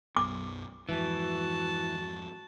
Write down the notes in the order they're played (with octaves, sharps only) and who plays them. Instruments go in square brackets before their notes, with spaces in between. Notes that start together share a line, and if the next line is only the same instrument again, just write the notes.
[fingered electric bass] B1 F#2 B3 [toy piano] D6
[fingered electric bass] F2 G#2 [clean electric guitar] E3 [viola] F#4 A5